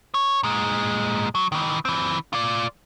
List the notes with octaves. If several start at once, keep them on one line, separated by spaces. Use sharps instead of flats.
C#5
A#2 G#3
F#3
D#3 E3
E3 C4
F4 D5